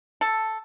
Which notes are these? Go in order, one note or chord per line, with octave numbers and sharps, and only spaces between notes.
A4